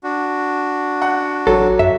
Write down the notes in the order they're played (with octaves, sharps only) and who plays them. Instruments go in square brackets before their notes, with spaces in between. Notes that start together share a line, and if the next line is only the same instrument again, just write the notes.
[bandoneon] D4 F#4
[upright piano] F#5
[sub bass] A1 [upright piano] F#3 [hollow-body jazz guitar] A4
[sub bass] F#2 [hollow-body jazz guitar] E5